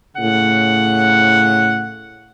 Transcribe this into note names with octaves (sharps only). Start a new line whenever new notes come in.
A2 C#3 F#5